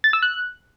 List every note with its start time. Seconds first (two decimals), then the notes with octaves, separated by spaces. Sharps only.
0.04 A6
0.13 E6
0.23 F#6